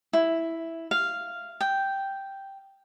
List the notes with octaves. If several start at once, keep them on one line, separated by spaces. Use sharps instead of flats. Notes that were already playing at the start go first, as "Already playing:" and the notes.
E4
F5
G5